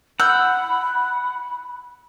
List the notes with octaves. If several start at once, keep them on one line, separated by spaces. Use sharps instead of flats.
F#5 B5 E6 G6